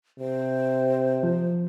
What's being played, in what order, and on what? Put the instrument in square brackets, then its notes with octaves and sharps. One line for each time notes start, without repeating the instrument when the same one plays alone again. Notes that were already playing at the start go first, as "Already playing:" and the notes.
[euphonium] C3 [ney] C5
[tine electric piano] F3